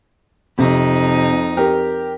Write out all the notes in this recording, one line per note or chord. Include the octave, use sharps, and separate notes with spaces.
F2 C3 D#4
G4 A#4